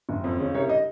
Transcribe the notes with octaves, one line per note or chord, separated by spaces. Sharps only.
F#1
F2
C#3
C2 C#5
D#5